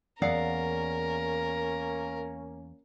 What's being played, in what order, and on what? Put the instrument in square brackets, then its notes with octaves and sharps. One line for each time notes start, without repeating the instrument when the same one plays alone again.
[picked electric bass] E2 [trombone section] A#3 C#4 [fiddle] A#4 [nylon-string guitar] D5 F5 F#5